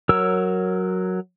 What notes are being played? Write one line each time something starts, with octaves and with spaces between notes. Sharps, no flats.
F#3 A#4 C#5 E6